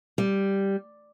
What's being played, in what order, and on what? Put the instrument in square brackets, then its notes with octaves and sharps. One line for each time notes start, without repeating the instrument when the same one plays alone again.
[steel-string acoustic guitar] G3